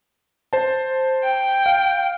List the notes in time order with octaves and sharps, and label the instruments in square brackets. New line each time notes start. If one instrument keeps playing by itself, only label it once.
[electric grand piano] C5 A5
[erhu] G5
[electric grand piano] F5